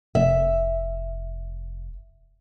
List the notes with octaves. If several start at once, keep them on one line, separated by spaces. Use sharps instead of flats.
F1 E5